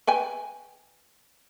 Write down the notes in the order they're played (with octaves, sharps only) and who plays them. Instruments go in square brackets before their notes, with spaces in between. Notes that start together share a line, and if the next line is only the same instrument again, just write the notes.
[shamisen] B4 G5 G#5